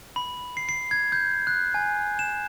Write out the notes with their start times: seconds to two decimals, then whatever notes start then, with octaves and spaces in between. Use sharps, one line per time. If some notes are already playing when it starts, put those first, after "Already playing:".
0.16 B5
0.57 C7
0.69 C7
0.91 G#6
1.12 G6
1.47 F#6
1.74 G#5
2.19 E7